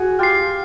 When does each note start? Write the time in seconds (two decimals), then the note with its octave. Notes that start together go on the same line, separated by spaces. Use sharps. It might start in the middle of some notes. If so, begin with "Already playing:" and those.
Already playing: F#4 G#4
0.19 F4 G4 F6 A6 C7